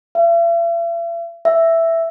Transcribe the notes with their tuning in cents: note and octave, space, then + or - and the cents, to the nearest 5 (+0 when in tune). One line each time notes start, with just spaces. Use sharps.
E5 +45
E5 +5